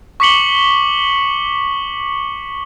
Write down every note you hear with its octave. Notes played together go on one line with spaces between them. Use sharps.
C#6 D6 B6 C#7 F#7 G7